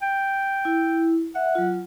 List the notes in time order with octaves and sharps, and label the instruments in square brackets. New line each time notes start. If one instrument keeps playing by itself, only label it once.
[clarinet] G5
[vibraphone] E4
[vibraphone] E5 [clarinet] F#5
[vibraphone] F#3 F4